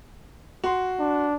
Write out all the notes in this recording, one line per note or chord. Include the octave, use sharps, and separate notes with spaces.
F#4 C6
D4